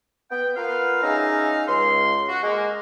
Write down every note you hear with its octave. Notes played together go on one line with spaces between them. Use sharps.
B3 G5
B3 F4 A#4 B4 F5
C#4 D#4 G#4 E5 F5 A#5
C#2 C6
F#4
G#3 A#3